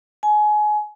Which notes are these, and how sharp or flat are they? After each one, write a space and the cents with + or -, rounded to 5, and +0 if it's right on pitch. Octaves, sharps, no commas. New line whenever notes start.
G#5 +25